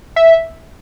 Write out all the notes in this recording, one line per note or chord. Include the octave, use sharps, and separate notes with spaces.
E5